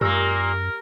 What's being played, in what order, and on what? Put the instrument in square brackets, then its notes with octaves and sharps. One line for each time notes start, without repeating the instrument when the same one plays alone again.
[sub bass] F#2 [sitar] A#2 A#3 [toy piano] G4 E6 [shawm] A#4